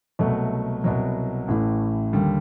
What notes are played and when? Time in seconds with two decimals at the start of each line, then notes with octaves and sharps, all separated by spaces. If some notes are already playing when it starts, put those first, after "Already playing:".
0.19 C2 B2 F#3 A3
0.84 C2 B2 F#3
1.48 A1 A2 E3 A3
2.13 D#2 D3 G3